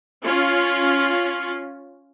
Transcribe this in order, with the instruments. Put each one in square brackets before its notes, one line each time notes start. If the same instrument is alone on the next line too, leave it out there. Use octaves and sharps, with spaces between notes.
[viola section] C#4 F4